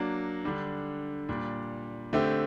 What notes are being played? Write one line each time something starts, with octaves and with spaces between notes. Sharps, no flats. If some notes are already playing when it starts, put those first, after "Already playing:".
Already playing: F#3 A#3 D4
D3 G3 D4
A#2 G3 D4
D3 A3 C4 G4